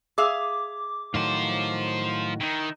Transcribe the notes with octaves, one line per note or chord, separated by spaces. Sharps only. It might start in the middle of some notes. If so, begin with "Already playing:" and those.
G#4 E5 F5 D6
A2 D#3 F#3 F4 C5
D#3 D#4 E4